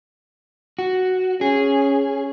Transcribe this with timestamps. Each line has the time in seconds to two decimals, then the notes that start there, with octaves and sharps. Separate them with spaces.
0.79 F#4
1.41 C#4 G#4